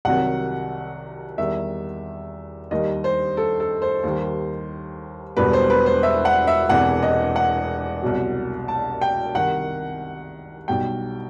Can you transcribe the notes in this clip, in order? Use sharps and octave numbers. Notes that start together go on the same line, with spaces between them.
C2 C3 D#3 F#3 F#5
E2 D#3 G3 E5
D#2 D#3 G3 D#5
C5
A4
A4
C5
D#2 D#3 G3
E1 E2 B2 G3 B4
C5
B4
C5
E5
F#5
E5
E1 E2 C3 E3 F#5
D#5
F#5
C2 B2 F#3
A5
G5
C2 C3 D#3 F#5
B1 B2 G3 G5